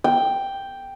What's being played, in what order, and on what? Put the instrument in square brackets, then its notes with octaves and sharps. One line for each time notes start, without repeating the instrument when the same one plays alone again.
[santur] G5